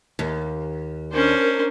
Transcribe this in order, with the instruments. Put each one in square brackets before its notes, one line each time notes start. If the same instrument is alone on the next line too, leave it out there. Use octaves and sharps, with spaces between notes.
[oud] D#2
[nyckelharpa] C#4 C5 [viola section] D4 A#4